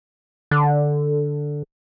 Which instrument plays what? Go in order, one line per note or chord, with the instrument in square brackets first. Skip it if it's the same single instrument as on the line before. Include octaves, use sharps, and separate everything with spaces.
[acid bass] D3